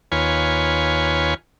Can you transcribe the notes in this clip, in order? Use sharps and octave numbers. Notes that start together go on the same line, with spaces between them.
D#2 F4 B4 C#5 G#5